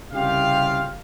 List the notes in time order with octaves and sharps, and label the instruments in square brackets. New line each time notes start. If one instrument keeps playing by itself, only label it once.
[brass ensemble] C2 C#3 F4 G4 F5